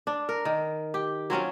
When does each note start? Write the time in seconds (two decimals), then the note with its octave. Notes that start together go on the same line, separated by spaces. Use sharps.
0.07 D4
0.29 A#4
0.45 D#3
0.94 G4
1.30 F#3 C4 C#4 F4